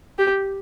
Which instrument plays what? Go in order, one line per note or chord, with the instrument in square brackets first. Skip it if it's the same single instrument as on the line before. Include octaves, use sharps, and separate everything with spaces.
[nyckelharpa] G4